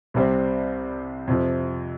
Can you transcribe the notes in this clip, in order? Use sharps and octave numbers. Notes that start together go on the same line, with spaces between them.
C2 C3 G3 C4
F2 C3 F3